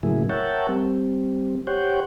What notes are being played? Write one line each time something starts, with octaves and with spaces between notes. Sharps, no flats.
A2 C#3 F#3 A#3 E4 G#4
A#4 C#5 E5 F#5 G5 A5
G3 C4
G4 C5 C#5 F#5 G5